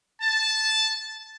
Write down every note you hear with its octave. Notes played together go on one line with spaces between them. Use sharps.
A5